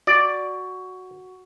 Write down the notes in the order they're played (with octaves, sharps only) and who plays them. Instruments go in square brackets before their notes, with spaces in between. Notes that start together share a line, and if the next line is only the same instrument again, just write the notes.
[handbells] F#4 [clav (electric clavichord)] D5